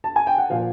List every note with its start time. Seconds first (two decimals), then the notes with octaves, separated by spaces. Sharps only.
0.04 A5
0.16 G#5
0.27 G5
0.38 F#5
0.50 A#2 F3 F5